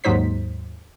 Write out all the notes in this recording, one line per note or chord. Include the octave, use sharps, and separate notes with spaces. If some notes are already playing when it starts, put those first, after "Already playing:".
D#2 G#2 F#3 D#4 C5 B6